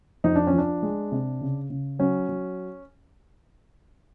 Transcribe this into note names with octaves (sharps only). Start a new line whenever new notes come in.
F2 D#4
D4
C#4
F3
D4
G#3
C3
C#3
C#3
F#3 C#4
F#3